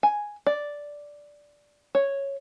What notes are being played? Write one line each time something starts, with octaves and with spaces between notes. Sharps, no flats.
G#5
D5
C#5